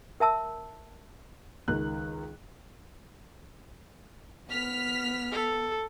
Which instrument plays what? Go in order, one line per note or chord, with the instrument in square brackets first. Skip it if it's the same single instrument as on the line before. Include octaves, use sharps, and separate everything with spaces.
[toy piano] A#4 E5 A5 E6
[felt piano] C#2 D#3 F#6
[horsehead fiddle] B3 [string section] F6 B6
[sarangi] A4